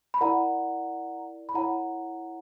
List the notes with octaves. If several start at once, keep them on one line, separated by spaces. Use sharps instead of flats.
B5
E4 A#4 D5 F#5 A#5
B5
E4 A#4 C#5 F#5 A#5